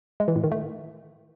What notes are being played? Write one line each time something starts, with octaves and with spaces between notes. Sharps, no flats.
G#3
E3
A2
D#3
A3